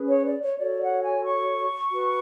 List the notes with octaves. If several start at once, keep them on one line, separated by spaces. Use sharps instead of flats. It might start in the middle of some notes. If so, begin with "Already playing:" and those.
Already playing: C#4 G#4 B4
C#5
D5
C#5
F#4 A4 C#5 D5
F#5
G#5
C#6
F#4 B4